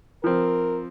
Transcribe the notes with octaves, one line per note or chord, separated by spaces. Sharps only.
F3 C4 A#4